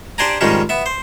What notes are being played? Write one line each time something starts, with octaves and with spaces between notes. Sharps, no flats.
D4 G4 C5 D5 G#5 A#5
F2 G#2 D#3 G3 C#4 D#4
B3 E5
C5